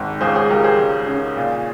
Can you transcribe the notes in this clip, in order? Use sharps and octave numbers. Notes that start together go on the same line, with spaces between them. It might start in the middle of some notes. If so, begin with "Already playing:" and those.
Already playing: G#1 G4
C#2 G#4 C5
G#4 C5
C#2 G4 A#4
G#4 C5
C#2
C#3
A#2